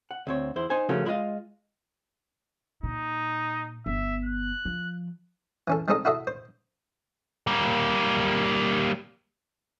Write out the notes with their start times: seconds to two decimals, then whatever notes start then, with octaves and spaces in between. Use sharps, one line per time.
0.11 F#5
0.27 D2 C4 C#5
0.56 E2 E4 C5
0.70 D#4 C5 G#5
0.89 C#3 F3 A3 C#4 F#4 A#4
1.05 G#3 E4 F4 G4 D#5 F5
2.83 A#2 D#4
3.86 G1 B3 E5
4.25 F#6
4.65 F3
5.68 E3 C#4 A4
5.88 G3 G#3 C4 D#4 A4 D#5
6.05 E4 F#4 A4 D#5 E5
6.27 C5
7.47 G3 A#3